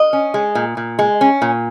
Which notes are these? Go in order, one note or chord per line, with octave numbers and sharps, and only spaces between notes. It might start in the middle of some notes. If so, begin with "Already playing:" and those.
Already playing: D#5
C#4
G#3
A#2
A#2
G#3
C#4
A#2